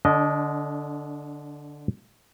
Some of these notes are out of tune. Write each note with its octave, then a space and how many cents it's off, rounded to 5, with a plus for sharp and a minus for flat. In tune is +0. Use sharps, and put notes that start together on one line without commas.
D3 +0 D4 -30 D#5 +0